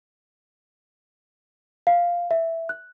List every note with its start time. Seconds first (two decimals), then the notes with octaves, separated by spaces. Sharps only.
1.87 F5
2.31 E5
2.69 F#6